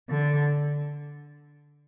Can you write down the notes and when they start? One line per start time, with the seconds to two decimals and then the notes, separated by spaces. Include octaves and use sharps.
0.08 D3